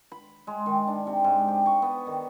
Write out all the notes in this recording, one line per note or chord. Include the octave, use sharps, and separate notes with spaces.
B5
G#3
D#3
D4
C3
G#2
G4
C#6
B3
D#3